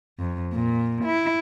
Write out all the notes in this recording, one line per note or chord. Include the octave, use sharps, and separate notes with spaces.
F2
A#2
E4